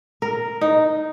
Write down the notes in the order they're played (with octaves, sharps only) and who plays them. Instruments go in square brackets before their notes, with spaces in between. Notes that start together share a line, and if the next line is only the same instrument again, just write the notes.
[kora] A#4
D#4